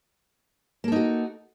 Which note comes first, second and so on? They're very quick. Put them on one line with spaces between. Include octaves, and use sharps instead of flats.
A#3 A4 D#4 F#4